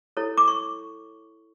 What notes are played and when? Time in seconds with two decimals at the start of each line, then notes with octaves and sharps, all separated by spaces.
0.17 E4 A4 C#5
0.38 D6
0.48 C#6